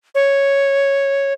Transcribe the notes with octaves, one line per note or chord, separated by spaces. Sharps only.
C#5